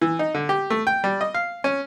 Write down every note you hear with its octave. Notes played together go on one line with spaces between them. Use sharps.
E3
D#4
D3
G4
A3
G5
G3
D#5
F5
C#4